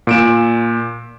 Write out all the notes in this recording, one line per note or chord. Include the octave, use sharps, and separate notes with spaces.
A#2 D7 E7